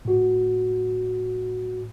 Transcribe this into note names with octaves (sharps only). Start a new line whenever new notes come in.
A2 F#4